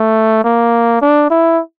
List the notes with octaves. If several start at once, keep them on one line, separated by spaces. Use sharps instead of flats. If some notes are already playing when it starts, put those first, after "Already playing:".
Already playing: A3
A#3
D4
E4